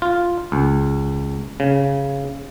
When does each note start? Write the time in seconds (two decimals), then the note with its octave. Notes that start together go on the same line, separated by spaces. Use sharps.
0.02 F4
0.52 C#2
1.60 C#3